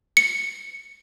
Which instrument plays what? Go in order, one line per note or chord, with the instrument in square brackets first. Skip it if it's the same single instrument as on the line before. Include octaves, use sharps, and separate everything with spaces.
[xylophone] C#7